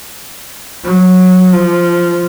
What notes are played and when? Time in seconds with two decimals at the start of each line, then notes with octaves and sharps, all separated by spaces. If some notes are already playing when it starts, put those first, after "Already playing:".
0.84 F#3
1.53 F3